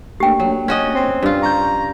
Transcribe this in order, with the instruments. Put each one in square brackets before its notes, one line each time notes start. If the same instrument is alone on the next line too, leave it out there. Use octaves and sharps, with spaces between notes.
[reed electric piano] A3 A#3 D4 [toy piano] G4 G5
[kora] F#3
C#4 F#4 D#5
[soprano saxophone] C4
[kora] G2 F4
[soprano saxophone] A#5 [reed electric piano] C#6 G6